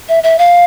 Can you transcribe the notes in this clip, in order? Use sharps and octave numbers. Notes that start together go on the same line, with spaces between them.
E5
E5
F5